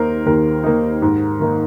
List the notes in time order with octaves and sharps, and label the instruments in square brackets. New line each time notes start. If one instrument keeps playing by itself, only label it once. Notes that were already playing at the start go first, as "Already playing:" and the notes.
Already playing: [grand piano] D#2 D#3 A#3 D#4 A#4 C5
D#2 A#4
D#3 A#3 D#4
G#2
D#3 A#3 D#4